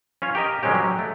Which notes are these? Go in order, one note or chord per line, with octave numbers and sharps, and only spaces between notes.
C#4 F4 C#5
G4 A#4 D#5
D3 F#3 G#3 C4 C#4 G4
F#3
A3